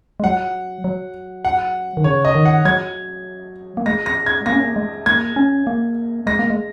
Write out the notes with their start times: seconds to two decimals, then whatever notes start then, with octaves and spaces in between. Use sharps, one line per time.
0.20 G#3
0.24 F#3 F#5
0.84 F#3
1.45 F#5
1.97 D#3
2.04 C#3 C#5
2.25 D#5
2.35 D#3
2.45 F#5
2.65 F#3 G#6
3.77 A#3
3.86 G#3 A#6
4.06 A#6
4.26 G#6
4.46 A#3 A#6
4.53 C#4
4.60 A#3
4.76 G#3
5.06 A#3 G#6
5.36 C#4
5.67 A#3
6.27 G#3 A#6
6.39 A#3
6.50 G#3